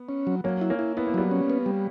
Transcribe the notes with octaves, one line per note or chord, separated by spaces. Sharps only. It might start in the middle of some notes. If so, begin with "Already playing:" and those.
Already playing: B3
C#4
F#3
F#3 A#3 C#4
E4
A#3 C#4
E4
B3 E4
A#3
F#3 G3 B3
C#4
B3
G3